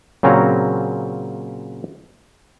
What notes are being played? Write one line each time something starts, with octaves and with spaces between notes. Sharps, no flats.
A#2 C#3 F#3 C4 C#4 A#5